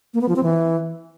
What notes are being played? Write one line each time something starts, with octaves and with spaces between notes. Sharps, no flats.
A#3
B3
F3
C4
E3